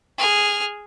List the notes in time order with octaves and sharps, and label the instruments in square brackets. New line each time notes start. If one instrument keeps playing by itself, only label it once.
[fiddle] G#4 F6